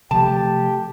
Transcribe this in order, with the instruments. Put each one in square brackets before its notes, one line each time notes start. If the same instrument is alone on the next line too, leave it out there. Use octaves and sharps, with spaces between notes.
[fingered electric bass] C3 F3 A3 [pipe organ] G4 [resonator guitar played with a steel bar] A5